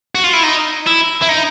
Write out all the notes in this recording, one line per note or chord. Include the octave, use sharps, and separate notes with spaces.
F#4
F4
E4
D#4
E4
E4
D#4